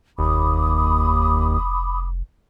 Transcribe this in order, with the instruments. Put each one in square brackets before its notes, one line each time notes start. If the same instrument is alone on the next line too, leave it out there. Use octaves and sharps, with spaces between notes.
[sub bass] F1 [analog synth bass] D#2 [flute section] B5 D6 D#6